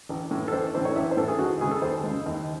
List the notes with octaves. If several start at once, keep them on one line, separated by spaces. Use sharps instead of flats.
A1
A2 E3
A4
A1 C5
A2 E3 C5
C#5
A1 E5
C5
A2 E3 A4
G#4
D#2 F#4
C#3 G#3 G#4
A4
D#2 C5
C#3 G#3
D#2